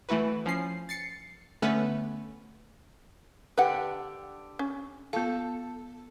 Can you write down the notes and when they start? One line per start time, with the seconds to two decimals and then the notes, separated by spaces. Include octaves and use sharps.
0.09 E3 A3 E4 F#4 B4
0.46 F3 C#4 C7
0.89 A6 C7 C#7
1.62 D3 A3 B3 C#4 B4
3.57 D3 D4 G4 B4 F#5
4.59 C#4
5.13 B3 F4 A4 F5